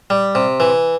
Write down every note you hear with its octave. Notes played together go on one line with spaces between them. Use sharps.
G3
C3
E3